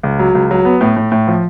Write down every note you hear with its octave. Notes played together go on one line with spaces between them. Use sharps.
C#2
F#3
C#2
F#3
B3
A2
A2
A2
F3